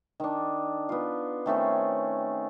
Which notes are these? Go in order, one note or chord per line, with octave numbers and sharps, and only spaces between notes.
D#3 D4
B3 F4
D#3 A3 C4 C#4